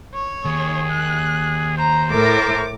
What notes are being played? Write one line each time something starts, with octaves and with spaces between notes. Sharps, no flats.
C#5
D#2 G#4
F#6
C5 A#5
A2 A4 A#4 D6